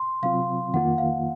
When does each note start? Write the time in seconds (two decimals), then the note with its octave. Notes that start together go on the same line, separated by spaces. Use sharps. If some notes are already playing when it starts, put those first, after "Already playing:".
Already playing: C6
0.23 C3 F#3 C4 F4 F5
0.74 F2 D#3 A#3 F4 F#5
0.98 F5